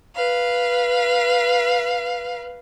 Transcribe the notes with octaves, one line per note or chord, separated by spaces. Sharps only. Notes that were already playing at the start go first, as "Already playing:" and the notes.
B4 F5